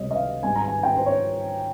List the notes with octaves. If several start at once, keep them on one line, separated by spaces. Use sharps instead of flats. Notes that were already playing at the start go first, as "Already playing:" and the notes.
Already playing: C#2 C3 G3 C#5 D#5
D#5
F5
G#2 G3 G#5
A#5
G#5
G5
C5
C#5